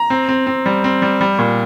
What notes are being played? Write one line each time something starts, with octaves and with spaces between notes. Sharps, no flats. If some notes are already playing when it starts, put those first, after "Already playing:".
Already playing: A#5
C4
C4
C4
G3
C4
G3
G3
A#2